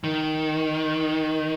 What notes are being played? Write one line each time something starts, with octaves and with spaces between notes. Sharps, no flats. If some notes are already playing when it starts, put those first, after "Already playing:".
D#3